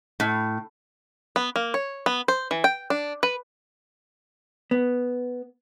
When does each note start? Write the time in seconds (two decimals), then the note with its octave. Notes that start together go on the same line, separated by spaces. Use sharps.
0.20 A2
1.36 B3
1.56 A#3
1.74 C#5
2.06 B3
2.28 C5
2.51 E3
2.64 G5
2.90 D4
3.23 B4
4.71 B3